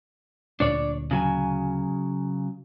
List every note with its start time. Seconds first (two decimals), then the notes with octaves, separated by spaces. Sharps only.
0.60 D2 A#2 D3 D4 C#5 D5
1.11 C#3 F#3 G#5